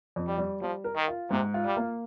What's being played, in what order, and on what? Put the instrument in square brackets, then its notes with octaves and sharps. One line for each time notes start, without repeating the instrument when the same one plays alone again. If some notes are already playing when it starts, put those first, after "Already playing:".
[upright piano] F2
[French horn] G3
[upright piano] G3
[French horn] F3 [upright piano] G3
[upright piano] A#4
[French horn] D#3
[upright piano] F4
[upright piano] G#2 [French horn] C3
[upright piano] F4
[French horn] G3
[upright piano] A#3